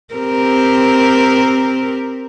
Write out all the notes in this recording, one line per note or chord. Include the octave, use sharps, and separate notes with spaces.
C4 G4 A#4